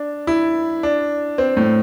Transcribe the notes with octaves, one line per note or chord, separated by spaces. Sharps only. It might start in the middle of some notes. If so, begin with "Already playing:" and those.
Already playing: D4
E4
D4
C4
A2